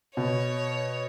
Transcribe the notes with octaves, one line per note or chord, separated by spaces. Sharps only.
B2 C#5